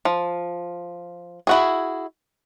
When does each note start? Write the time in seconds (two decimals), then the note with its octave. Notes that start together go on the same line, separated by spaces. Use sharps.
0.05 F3
1.47 E4 F#4 G#4